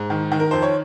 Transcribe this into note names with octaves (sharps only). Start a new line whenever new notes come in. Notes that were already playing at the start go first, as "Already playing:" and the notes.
Already playing: G#2
D#3
D#3
A#4
F2 C5
C#5